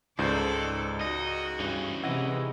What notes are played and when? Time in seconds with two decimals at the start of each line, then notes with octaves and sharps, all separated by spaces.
0.19 C#2 G#2 D#4 A4 C5 D5 G6 C7
1.01 D#4 F#4 D#5
1.60 G2 E3 C#4 D#4
2.03 C3 E3 G#3 E4 D#5 F#5